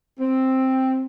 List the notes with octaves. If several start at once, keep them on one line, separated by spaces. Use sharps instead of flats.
C4